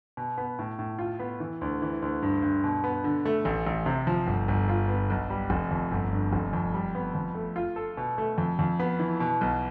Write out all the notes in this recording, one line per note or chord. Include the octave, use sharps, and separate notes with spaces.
B2
B3
A2
A2
F4
B3
E3
D2
E3
D2
G2
G2
B2
B3
D3
A3
A1
A1
C3
F3
G1
G1
F4
B3
B1
G3
F1
F2
G1
G2
F1
F2
G3
B3
F2
A3
F4
A4
B2
A3
F2
F2
B3
E3
B2
B1